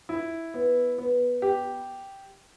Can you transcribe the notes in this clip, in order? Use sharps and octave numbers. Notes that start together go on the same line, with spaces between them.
E4
B3
B3
G4